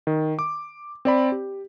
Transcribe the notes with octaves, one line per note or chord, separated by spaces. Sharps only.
D#3
D6
C4 D5 B5
G4